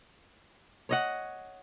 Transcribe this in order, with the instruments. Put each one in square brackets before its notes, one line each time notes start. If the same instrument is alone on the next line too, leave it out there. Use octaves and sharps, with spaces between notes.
[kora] C#5 D#5 F#5